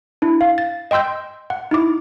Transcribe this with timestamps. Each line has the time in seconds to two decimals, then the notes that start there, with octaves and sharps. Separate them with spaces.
0.22 D4 E4
0.41 F5
0.58 A6
0.91 D#5 G5 C6 E6 G6
1.50 F#5
1.71 D#4 E4 D6